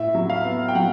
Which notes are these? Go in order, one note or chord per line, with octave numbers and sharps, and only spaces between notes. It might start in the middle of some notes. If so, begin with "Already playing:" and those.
Already playing: A2 E5
F#3
F5
B3
G5
F#3 F#5